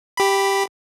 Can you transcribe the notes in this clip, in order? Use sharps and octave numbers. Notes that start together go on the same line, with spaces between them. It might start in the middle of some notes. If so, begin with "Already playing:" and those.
G4 B5